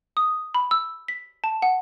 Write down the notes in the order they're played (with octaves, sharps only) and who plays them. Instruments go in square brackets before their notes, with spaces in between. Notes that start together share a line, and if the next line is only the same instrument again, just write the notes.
[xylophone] D#6
B5
E6
B6
A5
F#5